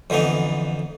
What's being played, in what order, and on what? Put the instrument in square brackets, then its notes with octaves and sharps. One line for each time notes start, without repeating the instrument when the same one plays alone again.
[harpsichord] F2 D3 E3 B3 D#4